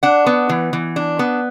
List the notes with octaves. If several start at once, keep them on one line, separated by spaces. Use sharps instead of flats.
D4 F#5
B3
E3
E3
D4
B3